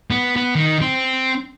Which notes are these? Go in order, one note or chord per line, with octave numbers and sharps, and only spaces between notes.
B3
B3
D#3
C4